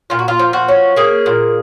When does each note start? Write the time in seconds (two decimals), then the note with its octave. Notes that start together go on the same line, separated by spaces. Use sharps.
0.10 A#2 F4
0.19 F#4
0.28 F4
0.39 F3
0.53 F#4
0.68 C#4
0.96 A#3 G#4
1.26 A#2